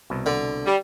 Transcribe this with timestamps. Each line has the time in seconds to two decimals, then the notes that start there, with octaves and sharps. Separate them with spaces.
0.10 C2 B2
0.26 D3
0.66 G3